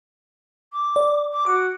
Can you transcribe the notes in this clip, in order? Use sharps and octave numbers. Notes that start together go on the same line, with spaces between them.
D6
D5
D6
F#4 D6